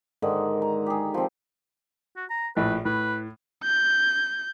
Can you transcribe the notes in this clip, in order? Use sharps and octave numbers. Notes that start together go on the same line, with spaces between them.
G#2 D3 D#3 D#5
A#5
G4 G#4
F3 C4
F#4
A#5
A#1 A2 B4
A2 B4
G6